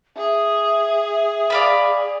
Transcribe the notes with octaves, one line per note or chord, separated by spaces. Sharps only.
G#4 E5
D5 F5 B5